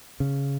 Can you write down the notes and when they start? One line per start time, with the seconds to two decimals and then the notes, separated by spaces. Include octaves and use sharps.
0.20 C#3